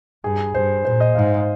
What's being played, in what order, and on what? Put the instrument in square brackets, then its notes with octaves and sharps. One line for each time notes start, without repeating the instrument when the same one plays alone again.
[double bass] G2 [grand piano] G#4
[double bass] G2 [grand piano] C5
[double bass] A#2 [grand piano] C5
[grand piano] D#5
[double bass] G#2 [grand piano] F5